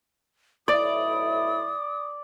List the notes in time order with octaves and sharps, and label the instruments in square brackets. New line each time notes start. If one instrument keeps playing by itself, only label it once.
[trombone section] B1 A2 E4 [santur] D5 [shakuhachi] D#6